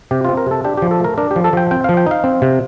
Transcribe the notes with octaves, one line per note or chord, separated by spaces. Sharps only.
C3 G4
C4 F4
A#4
C3 A4
D4 G4
G4
F3
A4
A3 A#4
D4 A#4
G4
F3
A4
F3 G5
C4 G5
F5
F3
G5
D#4 F5
C4
C3